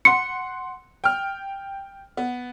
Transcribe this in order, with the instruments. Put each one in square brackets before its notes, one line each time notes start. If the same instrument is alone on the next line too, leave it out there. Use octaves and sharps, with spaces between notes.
[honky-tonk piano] F#5 C6 [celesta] C#7
[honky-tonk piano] G5 F6
B3